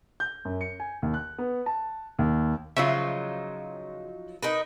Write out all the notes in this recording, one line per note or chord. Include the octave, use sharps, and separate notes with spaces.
G6
F#2
C#7
G#5
D#2
F#6
B3
A5
D#2
C#3 F3 F#3 D#4 F4 E5
D#4 A#4 B4